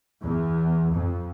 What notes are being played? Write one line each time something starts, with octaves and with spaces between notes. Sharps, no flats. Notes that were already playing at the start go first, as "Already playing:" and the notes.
E2
F2